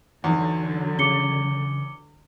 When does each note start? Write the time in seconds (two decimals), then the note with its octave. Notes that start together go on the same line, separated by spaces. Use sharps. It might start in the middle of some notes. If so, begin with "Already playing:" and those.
0.24 E2 D3 F#3 D#4 F#5
0.99 C#3 D6 C#7 G7